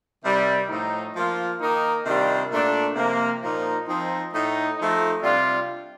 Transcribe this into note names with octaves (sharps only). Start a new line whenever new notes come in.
C3 D#3 G3
A2 F3 A3 D#4
F3 A#3 F4
D#3 A#3 D#4
C3 D#3 G3 D4 F4
A#2 A3 D4
C3 F3 A#3
A#2 F3 A#3 D#4
F3 C4 D#4
A2 A3 D#4
F3 A3 D#4
C3 G3 D4 F4